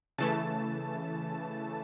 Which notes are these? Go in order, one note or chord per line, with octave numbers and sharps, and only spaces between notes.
C#3 E3 A3 A5